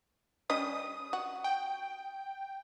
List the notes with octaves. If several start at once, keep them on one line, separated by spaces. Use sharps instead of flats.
G3 C#4 D#5 D#6
F#4
G5